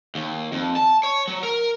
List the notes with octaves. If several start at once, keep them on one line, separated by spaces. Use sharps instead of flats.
D#2
F2
A5
C#5
F#3
A#4